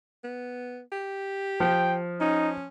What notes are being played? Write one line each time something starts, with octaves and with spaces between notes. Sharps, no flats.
B3
G4
F3 G5
C#4 D#4